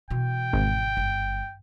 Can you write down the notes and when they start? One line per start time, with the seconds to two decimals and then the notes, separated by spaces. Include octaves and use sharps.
0.11 B2 E3 G5
0.53 G#1
0.97 G1